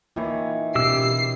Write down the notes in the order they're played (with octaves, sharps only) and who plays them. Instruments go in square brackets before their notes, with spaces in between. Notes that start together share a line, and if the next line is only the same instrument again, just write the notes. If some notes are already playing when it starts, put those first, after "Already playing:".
[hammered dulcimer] D#3 E3 C#5 [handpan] A#3 F4
[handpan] B2 C#4 [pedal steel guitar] G4 E6 [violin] C7